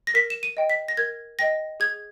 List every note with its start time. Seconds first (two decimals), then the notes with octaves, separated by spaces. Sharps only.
0.07 A#6
0.14 A#4 B6
0.30 E7
0.43 D#7
0.57 D#5 G5
0.70 B6
0.88 A#6
0.97 A#4 G#6
1.39 D#5 G5 A#6
1.80 G#4 G#6